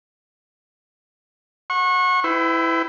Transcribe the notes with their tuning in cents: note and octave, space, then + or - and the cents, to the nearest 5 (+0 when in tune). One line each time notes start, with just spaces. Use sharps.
F#5 -15 C#6 -30
E4 +0 B4 +40 G5 -25